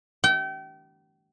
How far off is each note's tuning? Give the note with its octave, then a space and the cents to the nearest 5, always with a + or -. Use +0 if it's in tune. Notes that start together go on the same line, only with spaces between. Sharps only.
G5 -35